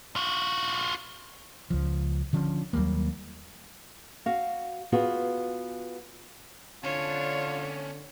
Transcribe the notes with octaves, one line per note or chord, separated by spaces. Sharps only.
F4 F#4
C#2 F3
D3 F3 C#4
D#2 F#3 G3 A#3
F#4 F5
B3 F4 F#4 G#4
D3 C#4 D4 F4 C#5